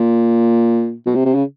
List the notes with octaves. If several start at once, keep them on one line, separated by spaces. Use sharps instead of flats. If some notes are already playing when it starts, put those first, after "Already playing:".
Already playing: A#2
B2
C3
C3
C#3